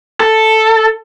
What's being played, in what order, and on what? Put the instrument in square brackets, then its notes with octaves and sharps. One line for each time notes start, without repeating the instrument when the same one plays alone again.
[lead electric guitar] A4